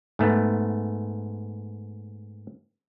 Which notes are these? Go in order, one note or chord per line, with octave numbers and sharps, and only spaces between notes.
G#2 A3 B3